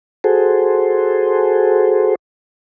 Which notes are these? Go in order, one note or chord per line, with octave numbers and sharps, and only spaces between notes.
F#4 G#4 A4 C5